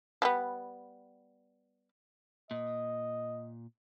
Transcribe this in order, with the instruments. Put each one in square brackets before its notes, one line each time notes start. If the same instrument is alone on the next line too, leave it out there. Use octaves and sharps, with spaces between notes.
[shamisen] F3 G3 B3
[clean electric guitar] A#2 [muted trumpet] D#5